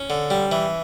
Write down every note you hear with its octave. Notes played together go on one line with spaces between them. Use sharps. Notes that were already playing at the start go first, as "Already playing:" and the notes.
Already playing: C#4
D3
G3
E3